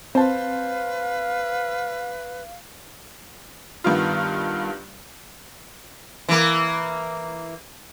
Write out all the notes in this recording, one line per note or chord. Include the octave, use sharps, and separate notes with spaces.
C4 B4 C5 F5 A5
G2 D#3 B3 F4
E3 A#3